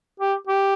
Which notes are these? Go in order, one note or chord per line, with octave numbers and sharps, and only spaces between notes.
G4
G4